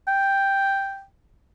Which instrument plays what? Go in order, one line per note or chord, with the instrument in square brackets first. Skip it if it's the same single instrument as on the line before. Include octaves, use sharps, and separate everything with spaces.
[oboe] G5